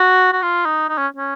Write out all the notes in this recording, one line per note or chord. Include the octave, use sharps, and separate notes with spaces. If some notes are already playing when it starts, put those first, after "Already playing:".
Already playing: F#4
F#4
F4
D#4
D#4
C#4
C#4